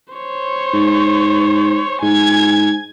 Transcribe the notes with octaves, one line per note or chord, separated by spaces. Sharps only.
C5 C#5
G#2
G#2 G#5 G#6